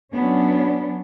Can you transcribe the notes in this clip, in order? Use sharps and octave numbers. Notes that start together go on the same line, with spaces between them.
F#3 B3 C#4 D4